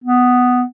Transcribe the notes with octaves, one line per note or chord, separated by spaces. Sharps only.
B3